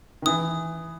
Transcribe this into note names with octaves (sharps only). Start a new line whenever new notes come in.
D#3
E3 D#6